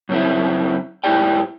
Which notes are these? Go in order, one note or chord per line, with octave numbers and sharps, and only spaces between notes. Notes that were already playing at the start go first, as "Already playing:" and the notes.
F#2 C#3 C4 E4
G#2 A#3 E4 G4 D5 G5